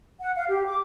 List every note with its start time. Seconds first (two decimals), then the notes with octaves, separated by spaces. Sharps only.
0.20 F#5
0.36 F5
0.48 G4
0.65 D6